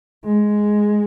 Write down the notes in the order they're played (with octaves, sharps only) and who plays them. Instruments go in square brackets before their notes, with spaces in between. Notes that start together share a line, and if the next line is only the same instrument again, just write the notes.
[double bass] G#3